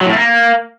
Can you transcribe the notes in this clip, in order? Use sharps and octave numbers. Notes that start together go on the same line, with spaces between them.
F#3
A2
A3
A#3